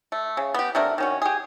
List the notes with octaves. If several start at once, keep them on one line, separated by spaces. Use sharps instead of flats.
A3
C#3
B3 G4
C3 A3 D4 A#4
D#3 C#4 F#4
G4 G#4